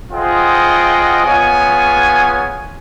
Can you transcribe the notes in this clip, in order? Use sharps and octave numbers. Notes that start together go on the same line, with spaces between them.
F4 G#4 C5 D#5 F#5 G5
B3 F4 G#4 C#5 G#5